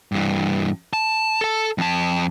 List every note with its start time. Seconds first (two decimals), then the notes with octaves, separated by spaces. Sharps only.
0.12 G2 E3
0.93 A5
1.41 A4 A5
1.78 F2 A5